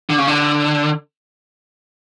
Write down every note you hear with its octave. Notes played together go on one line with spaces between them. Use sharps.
D3
C#3
D3